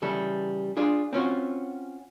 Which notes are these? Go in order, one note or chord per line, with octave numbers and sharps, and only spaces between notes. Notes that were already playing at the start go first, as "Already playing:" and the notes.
C#3 E3 G3 A4
D4 F4 G#4
C4 C#4 F4 F#4